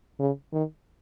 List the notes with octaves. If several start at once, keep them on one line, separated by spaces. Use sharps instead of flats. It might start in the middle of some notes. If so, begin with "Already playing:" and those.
C#3
D#3